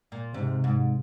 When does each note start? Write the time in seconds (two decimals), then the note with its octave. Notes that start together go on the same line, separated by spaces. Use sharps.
0.12 A#2
0.34 G#2 C3
0.64 G#2